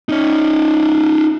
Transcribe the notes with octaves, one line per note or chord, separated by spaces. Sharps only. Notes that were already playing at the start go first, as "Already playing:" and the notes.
C#4 D#4